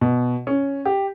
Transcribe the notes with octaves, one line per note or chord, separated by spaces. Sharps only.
B2
C#4
G4